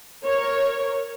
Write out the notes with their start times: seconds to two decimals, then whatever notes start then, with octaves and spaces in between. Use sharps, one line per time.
0.25 A#4 C#5